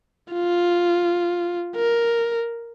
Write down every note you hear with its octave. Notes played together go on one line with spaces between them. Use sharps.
F4
A#4